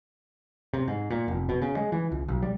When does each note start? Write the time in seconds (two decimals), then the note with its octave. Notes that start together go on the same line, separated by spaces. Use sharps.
0.73 C3
0.88 G#2
1.10 A#2
1.28 F1
1.49 B2
1.62 C#3
1.77 G#3
1.92 E3
2.12 C#2
2.28 B1
2.42 G3